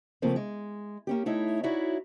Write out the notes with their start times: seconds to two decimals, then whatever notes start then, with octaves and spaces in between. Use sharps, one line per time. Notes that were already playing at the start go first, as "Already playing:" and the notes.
0.22 C#3 F3 A3 A#3 C4
0.36 G#3
1.07 A#3 C#4 G4
1.26 A3 D#4 E4 C#5
1.63 D#4 E4 F#4 C#5 D5 E5